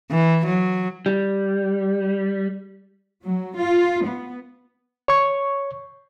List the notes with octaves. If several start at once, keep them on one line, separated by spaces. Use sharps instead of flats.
E3
F#3
G3
F#3
F4
B3
C#5 C#6